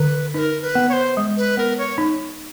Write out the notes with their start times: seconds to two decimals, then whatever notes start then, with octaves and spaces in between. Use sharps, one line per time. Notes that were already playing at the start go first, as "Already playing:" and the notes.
Already playing: D3 B4
0.34 D#4 A#4 B4
0.62 B4
0.75 B3
0.89 C#5
0.93 C5
1.17 G#3
1.37 B4
1.57 B3 A#4
1.78 C#5
1.98 D#4